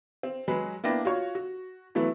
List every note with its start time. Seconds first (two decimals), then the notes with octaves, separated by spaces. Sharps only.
0.23 C4
0.48 F#3 G#3 F#4 G#4 B4
0.84 A#3 B3 D4 E4 G5 A#6
1.05 F4 F#4 C#5
1.35 F#4
1.95 E3 F#3 A3 B3